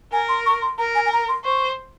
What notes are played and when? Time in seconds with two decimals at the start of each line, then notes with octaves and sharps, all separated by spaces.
0.13 A#4 G#5
0.29 C6
0.46 C#6
0.62 C6
0.78 A#4 A#5
0.95 G#5
1.06 G#5
1.12 A#5
1.29 C6
1.44 C5 C#6